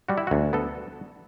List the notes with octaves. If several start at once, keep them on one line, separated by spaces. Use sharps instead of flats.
G3 F#4
E4
D2 F#4
B3 A4